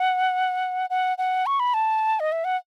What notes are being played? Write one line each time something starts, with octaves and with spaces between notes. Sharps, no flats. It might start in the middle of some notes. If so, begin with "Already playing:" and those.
Already playing: F#5
F#5
F#5
C#6
B5
A5
D#5
E5
F#5